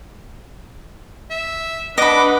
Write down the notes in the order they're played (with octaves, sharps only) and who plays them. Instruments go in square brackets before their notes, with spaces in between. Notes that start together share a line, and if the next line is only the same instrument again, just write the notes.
[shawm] E5
[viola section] D4 B4 F#5 [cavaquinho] D#5 B5 [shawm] D6